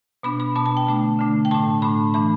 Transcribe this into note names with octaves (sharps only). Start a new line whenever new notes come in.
B2 B3 D4 B5
B5
B2 B3 D4 A5
A5
G5
D3 A3 D4
D3 A3 D4
G5
A2 A3 D4 A5
A2 A3 D4 B5
E3 A3 D4 B5